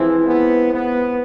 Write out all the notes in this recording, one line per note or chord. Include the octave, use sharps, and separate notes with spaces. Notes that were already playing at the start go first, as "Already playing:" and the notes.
Already playing: E3 F3 G#3 C4 E4
B3
B3